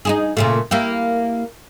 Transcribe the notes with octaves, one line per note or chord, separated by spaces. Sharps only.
D#4 E4 G#4
A#2 C#3 A3
A#3 E4 G4